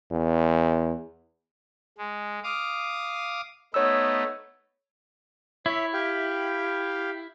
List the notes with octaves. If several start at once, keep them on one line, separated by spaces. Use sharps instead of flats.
E2
G#3
F5 D6 D#6
A3 B3 D#4 C#5 E6
E4 C#5 E5
G4 F5 G5